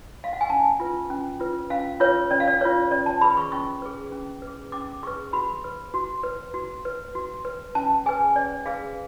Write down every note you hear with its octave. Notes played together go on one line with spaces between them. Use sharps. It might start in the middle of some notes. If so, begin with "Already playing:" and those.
F5
F#5
G#5
C#4 A5
F4 B4
C#4
F4 B4
C#4 F5
F4 B4 C#5
C#4 D5
F5
D5
F4 B4 C#5
C#4 D5
A5
G#4 B4 B5
C#6
C#4 C#6
G#4 B4
C#4
B4
G#4
C#4 D6
G#4 B4 C#6
F#4 B5
B4
F#4
B4
F#4
B4
F#4
B4
C#4 A5
G#4 B4 G#5
C#4 D5
G#4 B4 F5